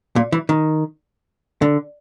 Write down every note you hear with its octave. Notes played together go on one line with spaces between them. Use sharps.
A#2
E3
D#3
D3